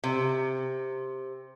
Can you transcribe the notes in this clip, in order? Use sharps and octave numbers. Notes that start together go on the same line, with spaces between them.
C3